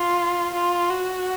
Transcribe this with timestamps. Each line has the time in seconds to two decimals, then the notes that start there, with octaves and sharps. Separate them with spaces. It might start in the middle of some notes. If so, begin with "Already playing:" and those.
Already playing: F4
0.54 F4
0.90 F#4